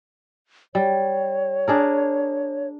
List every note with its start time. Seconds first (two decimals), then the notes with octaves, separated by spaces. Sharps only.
0.75 G3 C#5
1.68 D4 G#4 A#4